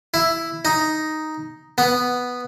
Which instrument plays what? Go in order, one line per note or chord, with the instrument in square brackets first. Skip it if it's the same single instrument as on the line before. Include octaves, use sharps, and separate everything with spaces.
[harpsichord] E4
D#4
B3